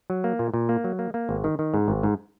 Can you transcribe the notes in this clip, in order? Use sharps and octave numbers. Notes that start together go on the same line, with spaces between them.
F#3
A#3
A#2
A#2
A#3
F#3
A#3
A#3
G#1
D#3
D#3
G#2
G#1
G#2